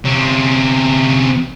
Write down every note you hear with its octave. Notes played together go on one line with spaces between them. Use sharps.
C3 C#4